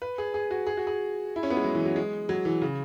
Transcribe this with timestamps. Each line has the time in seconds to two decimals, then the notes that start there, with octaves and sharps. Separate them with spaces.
0.02 B4
0.18 G#4
0.34 G#4
0.51 F#4
0.67 G#4
0.77 F#4
0.87 G#4
1.36 E4
1.43 C#4
1.50 B3
1.57 G#3
1.64 F#3
1.75 E3
1.85 F#3
1.96 G#3
2.29 F#3
2.45 E3
2.62 C#3